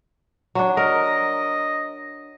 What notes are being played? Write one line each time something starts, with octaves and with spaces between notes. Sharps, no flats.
F#3 D4
A#4 D#5